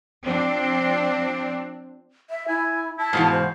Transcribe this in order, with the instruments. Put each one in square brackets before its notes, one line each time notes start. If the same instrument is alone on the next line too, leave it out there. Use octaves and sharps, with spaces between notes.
[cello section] F3 C4 D4
[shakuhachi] E5
[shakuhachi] E4 [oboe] G#5
[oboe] E4 [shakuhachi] A5
[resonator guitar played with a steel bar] G#2 B2 E3 [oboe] F5
[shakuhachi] C5